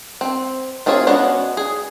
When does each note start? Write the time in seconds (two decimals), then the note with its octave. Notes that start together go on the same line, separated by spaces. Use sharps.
0.21 C4
0.86 A3 C4 F4 G#4 C#5
1.07 G#3 B3 C#4 D4 F#4
1.57 G#4